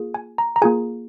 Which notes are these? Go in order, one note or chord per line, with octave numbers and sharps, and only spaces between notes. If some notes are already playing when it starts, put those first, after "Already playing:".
Already playing: A#3 F4 G#4
G#5
A#5
A#5
A#3 F4 G#4 G#5